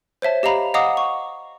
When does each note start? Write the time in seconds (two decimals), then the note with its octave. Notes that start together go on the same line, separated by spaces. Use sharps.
0.22 C5 C#5 E5 A5
0.43 G4 D#5 F5 A#5 B5
0.74 D#5 F5 F#5 A#5 D6 D#6
0.97 C#6